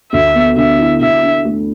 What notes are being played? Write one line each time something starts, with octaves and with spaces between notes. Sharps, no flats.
D2 E5
B3
D3 E5
E4
D3 E5
D4
A3